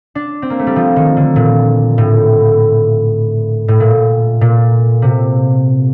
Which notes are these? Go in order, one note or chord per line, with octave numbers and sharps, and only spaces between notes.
D4
C4
A#3
A3
G3
F3
D#3
D3
A#2
A2
A2
A#2
A#2
C3